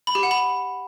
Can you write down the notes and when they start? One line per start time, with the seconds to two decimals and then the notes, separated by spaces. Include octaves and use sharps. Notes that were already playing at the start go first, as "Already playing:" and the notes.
0.07 B5
0.15 G4
0.23 F#5
0.31 B5